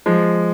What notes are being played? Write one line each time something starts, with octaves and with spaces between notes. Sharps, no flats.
F3 G#3